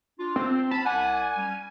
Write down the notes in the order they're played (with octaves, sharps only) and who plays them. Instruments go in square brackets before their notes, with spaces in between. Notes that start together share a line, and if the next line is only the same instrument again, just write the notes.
[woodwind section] D4 F4
[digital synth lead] C4
[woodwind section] C#4 B5 [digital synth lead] A5
[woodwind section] C2 D5 F#5 [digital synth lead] G#5
[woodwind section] G3 C#4